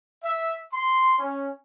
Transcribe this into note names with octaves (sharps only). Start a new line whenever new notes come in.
E5
C6
C#4